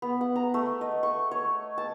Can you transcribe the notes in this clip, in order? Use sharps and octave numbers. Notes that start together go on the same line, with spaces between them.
B3
F#5
A#5
A3
D#5
C#6
C#5
A5